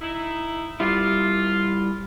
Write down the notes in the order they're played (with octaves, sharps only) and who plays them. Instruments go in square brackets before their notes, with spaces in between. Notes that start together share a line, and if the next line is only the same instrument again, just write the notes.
[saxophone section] D#4 E4
[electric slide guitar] G3 E4 [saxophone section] F4